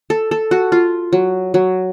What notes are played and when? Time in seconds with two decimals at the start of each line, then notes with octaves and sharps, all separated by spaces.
0.10 A4
0.31 A4
0.51 F#4
0.72 F4
1.13 F#3
1.54 F#3